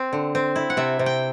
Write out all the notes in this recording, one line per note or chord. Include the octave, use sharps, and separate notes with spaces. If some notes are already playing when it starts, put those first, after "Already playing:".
Already playing: C4
D3
C4
E4
F#5
C3 E5
C3
G5